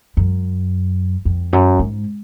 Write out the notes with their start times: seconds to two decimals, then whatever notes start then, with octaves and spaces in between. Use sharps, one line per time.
0.17 F#2
1.25 F2
1.53 F#2
1.79 G#2